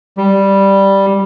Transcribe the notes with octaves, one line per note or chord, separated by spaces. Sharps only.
G3